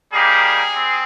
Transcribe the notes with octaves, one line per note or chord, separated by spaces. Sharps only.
G3 A#3 D#4 G4 G#4
C4